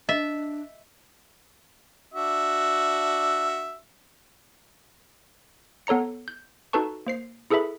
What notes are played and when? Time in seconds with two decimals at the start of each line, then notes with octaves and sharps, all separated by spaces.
0.09 D4 D#5 E5
2.14 D4 F#4 E5
5.87 B3 A4 C#5 A#5 C#7
6.28 G6
6.73 D#4 F#4 A4 B4 A5 C#6
7.06 A#3 C5 C7
7.50 E4 G#4 A4 B4 E5 B5